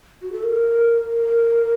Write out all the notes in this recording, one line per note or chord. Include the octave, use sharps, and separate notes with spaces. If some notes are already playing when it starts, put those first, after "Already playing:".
F#4
A4
A#4